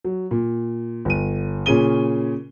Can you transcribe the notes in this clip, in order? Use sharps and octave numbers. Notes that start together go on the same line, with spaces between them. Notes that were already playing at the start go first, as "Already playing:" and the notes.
F#3
A#2
G1 D#7
A#2 C#3 C#4 G#4 D#7 G7